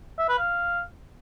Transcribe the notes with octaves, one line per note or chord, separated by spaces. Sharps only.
E5
B4
F5